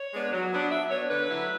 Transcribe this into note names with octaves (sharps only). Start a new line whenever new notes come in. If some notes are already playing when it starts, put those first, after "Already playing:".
Already playing: C#5
G#3 B3 D4
F#3
B3 D4
F#3 E5
B3 D4 C#5
D3 B4
F#3 A3 E4